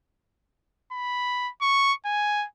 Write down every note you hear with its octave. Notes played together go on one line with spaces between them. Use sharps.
B5
C#6
G#5